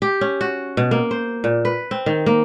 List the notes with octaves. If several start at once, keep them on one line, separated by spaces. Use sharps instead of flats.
G4
C#4
F#4
B2
A#3
C5
A#2
B4
C4
D#3
A#3